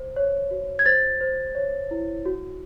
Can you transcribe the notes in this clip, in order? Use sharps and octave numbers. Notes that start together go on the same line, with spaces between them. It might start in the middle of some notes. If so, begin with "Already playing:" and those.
Already playing: C5
C#5
F#4
G#6
C5 A6
C5
C#5
E4
F#4